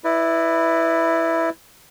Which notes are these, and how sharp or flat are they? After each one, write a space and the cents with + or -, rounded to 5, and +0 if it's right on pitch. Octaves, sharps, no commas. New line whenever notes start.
E4 +0 B4 +5 D5 +40